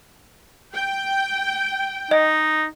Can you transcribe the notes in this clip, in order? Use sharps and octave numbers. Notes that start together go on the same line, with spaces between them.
G5
D#4 D#5